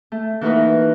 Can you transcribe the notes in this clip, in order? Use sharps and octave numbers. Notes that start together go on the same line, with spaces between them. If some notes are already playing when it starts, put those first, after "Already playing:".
A3
E3 A#3 D#4 F#4 A#4 B4